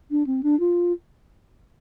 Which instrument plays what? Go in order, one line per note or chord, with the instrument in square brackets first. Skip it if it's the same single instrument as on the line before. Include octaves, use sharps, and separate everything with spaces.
[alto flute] D4
C4
D4
F4